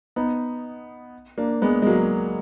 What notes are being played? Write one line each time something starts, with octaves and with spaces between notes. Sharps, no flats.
B3 D#4
A#3 D4
G#3 B3
G#3
F#3 A#3